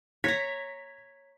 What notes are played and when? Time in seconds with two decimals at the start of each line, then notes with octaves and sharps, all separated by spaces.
0.24 C#5 A#5 B6